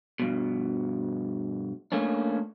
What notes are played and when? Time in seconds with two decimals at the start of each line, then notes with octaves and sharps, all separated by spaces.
0.20 G2 B2
1.92 A3 A#3 C#4 D4